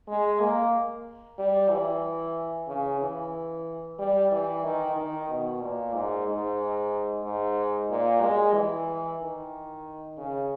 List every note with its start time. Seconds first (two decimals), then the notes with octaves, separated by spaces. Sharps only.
0.08 G#3
0.40 A#3
1.39 G3
1.70 E3
2.68 C#3
3.01 E3
3.99 G3
4.32 E3
4.64 D#3
4.96 D#3
5.29 B2
5.62 A#2
5.94 G#2
6.27 G#2
7.24 G#2
7.90 A#2
8.21 G#3
8.54 E3
9.20 D#3
10.17 C#3